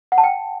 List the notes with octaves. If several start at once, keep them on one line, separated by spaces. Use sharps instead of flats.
F#5
A5
G5